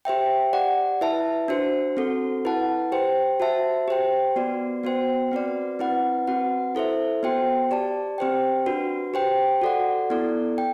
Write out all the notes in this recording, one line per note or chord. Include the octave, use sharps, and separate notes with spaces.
G4 C5 E5 G5
G4 D5 F#5
E4 B4 E5 A5
D4 F#4 C5
C4 F#4 A4
E4 B4 F#5 A5
G4 C5 G5
F#4 C5 E5 A5
G4 C5 G5
B3 F#4 B4 D5
B3 F#4 C5 G5
C4 F#4 B4 D5
C4 E4 B4 F#5
C4 F#4 B4 F#5
E4 A4 C5 E5
B3 F#4 C5 G5
G4 D5 A5
C4 G4 C5 G5
D4 F#4 B4
G4 C5 G5
F#4 A4 D5 F#5
B3 E4 A4 D5
G5